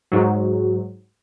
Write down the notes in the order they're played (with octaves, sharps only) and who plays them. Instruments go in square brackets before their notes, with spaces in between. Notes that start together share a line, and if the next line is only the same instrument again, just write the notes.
[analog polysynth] G#2 F#3